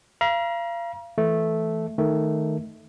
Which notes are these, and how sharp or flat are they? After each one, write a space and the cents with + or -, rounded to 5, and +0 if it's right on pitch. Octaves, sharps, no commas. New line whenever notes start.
F5 -30 A#5 +35
E3 +0 A3 -5
D#3 +0 A3 +0